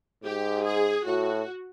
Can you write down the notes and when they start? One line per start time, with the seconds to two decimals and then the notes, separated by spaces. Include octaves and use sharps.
0.24 G#2 G4
0.65 G#4
1.05 A2 F#4